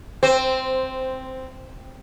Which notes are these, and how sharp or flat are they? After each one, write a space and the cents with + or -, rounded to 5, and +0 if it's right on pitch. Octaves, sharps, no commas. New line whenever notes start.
C4 +0 C5 -10